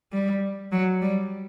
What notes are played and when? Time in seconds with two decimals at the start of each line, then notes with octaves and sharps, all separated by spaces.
0.12 G3
0.72 F#3
1.02 G3